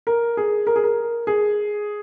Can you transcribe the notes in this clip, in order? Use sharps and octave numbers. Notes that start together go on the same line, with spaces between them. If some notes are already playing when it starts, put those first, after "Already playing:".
A#4
G#4
A#4
G#4
A#4
G#4